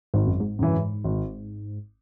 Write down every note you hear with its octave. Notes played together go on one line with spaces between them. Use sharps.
G#1 G#2
F#2
G#2
F#2 C#3 E3
G#1